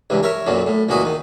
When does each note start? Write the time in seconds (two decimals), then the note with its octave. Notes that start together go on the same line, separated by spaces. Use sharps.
0.10 C#2 G2 E3
0.23 A#4 C#5 E5
0.47 B1 F#2 A#2 F#3
0.66 A2
0.89 C#2 A#2 E3 F#4 D#6
1.05 D#3